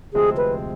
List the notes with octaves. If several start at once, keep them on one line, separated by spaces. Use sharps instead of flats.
D2 C3 F3 G#3 C4 G#4
B4